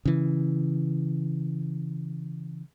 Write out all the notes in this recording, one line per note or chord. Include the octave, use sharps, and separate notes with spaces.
C#3 E3